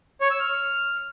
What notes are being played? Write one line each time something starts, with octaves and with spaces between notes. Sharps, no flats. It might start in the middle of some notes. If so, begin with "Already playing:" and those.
C#5
E6
F6